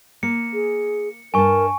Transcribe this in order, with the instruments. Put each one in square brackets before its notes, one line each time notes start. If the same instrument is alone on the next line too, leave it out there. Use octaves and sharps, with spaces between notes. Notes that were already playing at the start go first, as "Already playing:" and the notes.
[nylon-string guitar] A#3 [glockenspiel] C#7
[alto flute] G#4
[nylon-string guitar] G2 A5 [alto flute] A#4 [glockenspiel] G#5 C#6